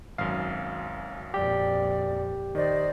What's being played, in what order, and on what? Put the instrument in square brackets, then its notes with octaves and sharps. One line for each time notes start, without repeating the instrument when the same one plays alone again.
[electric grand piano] G#1 F#2 [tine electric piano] F5
[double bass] F2 A#2 [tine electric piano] G4 [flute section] D5
[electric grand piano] D#3 [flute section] C5 D5 D#5